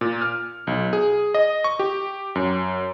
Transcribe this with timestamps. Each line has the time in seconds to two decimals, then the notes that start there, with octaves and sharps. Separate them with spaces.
0.01 A#2
0.22 F6
0.67 B1
0.93 G#4
1.34 D#5
1.64 C#6
1.79 G4
2.35 F#2